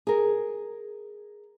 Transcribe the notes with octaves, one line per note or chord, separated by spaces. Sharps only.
G#4 A#4